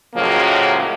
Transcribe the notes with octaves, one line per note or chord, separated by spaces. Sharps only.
A2 C#3 F3 F#3 G#3 A#3